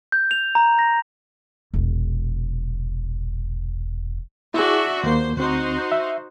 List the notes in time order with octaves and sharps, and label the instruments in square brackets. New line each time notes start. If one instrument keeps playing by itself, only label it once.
[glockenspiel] G6
F7
A#5
A#6
[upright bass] E1 A#1
[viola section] D4 F#4 E5 [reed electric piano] E4 G#4
[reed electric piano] D#2 A#3 [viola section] C5
[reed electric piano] D2 C4 [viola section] D#4 F#4 C5
[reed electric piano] E5